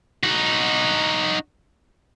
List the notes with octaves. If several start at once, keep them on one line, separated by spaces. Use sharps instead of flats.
D#4 F#4